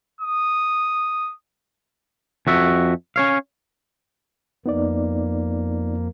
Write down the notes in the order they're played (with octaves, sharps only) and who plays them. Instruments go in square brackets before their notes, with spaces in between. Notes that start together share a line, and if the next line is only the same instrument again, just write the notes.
[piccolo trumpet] D#6
[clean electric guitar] F2 F#4 E5
C#4 C#5 F5
[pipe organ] F2 A#3 [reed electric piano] B3 D#4 D5